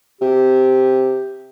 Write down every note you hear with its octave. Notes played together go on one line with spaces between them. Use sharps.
C3 G4